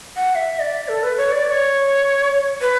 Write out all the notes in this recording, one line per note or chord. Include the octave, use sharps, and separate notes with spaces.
F#5
F#5
E5
D5
A4
B4
C#5
D5
D5
C#5
B4